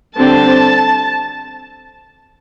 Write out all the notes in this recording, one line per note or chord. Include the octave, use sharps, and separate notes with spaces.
D3 G3 C4 A5